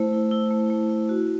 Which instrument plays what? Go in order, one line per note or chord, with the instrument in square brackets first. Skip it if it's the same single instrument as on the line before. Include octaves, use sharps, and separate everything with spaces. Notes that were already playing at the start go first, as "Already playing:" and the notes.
Already playing: [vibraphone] A3 E4 C5
E4
E4
A3
A3
E4
F#4